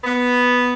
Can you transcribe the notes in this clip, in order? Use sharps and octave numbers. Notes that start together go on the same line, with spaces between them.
B3